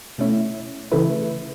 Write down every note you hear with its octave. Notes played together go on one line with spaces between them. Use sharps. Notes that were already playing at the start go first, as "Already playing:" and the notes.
B2 A3 C#4 E4
C#3 E3 A3 E4 B4